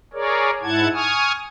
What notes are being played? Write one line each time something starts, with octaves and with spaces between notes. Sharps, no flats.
G#4 A#4 C#5 D5
G#2 E4 F#5 A5 G#6
G#5 C#6 D#6 F6